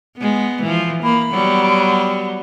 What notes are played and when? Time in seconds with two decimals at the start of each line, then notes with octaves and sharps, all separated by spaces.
0.17 G#3 B3
0.62 E3 F3
1.03 A#3 B5
1.32 F#3 G3 B3